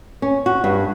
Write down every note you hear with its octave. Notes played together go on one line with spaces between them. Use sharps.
C#4
F#4
G2